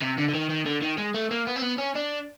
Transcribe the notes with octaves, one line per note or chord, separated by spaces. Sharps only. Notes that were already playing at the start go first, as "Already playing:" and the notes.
C3
D3
D3
D#3
D#3
D3
D#3
G#3
A3
A#3
B3
C4
B3
C#4
D4